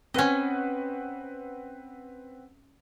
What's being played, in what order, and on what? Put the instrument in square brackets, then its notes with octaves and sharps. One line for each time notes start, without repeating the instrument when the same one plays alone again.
[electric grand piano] C4 B4 F#5 [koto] C#4 D#5